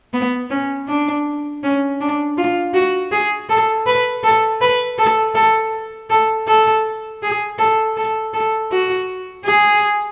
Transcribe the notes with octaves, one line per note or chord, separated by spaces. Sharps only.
B3
C#4
D4
C#4
D4
F4
F#4
G#4
A4
B4
A4
B4
A4
A4
A4
A4
G#4
A4
A4
A4
F#4
G#4